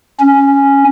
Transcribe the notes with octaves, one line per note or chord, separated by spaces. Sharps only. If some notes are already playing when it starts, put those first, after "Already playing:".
C#4